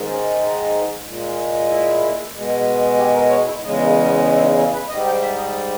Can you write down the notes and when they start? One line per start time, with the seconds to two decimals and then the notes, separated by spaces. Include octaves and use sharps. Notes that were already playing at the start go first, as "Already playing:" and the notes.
Already playing: G#2 D#3 G#3
0.10 C#4
0.42 D#4
1.05 A#2 G#3
1.69 E4
2.34 B2 G#3
2.98 G4
3.14 A#4
3.29 C#5
3.46 E4
3.61 E2 C#3 G#3 D#4
3.82 A#3
4.04 B3
4.25 C#4
4.33 E4
4.41 D#4
4.57 E4
4.73 B4
4.89 G#2 G3 D#5
5.06 G5
5.21 E5
5.37 D#5